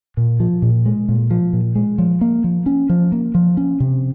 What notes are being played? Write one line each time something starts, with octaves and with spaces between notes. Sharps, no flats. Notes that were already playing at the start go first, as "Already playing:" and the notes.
A#2
F3
A#2
G#3
A#2
F3
A#2
G#3
F3
A#3
F3
C#4
F3
A#3
F3
C#4
C3